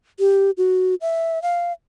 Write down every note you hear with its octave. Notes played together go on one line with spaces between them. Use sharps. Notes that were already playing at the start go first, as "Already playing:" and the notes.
G4
F#4
E5
F5